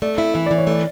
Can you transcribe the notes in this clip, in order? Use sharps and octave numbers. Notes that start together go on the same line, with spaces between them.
A3 D5
E4 E5
E3 E5
E3 D5
C#5
A3 D5